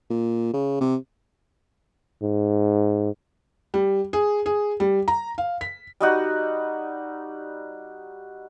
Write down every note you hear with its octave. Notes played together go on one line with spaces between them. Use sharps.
A#2
C#3
C3
G#2
G3
G#4
G#4
G3
A#5
F5
B6
G3 D#4 F#4